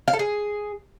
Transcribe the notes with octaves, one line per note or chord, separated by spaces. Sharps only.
F5
A4
G#4